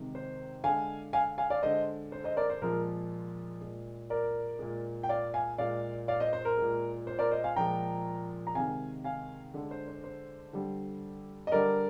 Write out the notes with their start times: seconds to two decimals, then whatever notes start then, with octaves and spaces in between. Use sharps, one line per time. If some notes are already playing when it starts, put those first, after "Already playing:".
Already playing: C3 D#3 G#3
0.15 C5
0.64 D3 G#3 F5 G#5
1.13 F5 G#5
1.38 F5 G#5
1.50 D5 F5
1.63 D3 G#3 C5 D#5
2.12 C5
2.24 C5 D#5
2.37 A#4 D5
2.50 C5
2.62 A#2 F3 G#3 A#4
3.61 A#2 G#3
4.10 A#4 D5
4.59 A#2 G#3
5.03 G5
5.09 D5 F5
5.34 F5 G#5
5.58 A#2 G#3 D5 F5
6.08 D5 F5
6.20 C5 D#5
6.33 C5
6.45 A#4
6.57 A#2 G#3
7.07 C5
7.19 A#4 D5
7.31 C5 D#5
7.44 F5 G#5
7.56 A#2 F3 G#3 G5 A#5
8.47 A#5
8.55 C3 D#3 G#3 F5 G#5
9.04 F5 G#5
9.54 D3 G#3
9.71 C5
9.88 C5
10.04 C5
10.53 D3 G3
11.47 D#5
11.52 D3 G3 A#4 D5